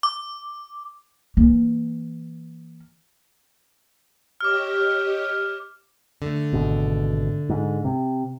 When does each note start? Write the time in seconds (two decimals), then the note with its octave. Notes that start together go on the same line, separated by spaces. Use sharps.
0.03 D6
1.37 E3 A#3
4.41 G4 C#5 D#5 D6 F6
6.22 D3 A3
6.53 G#1 B2
7.49 G#2
7.85 C3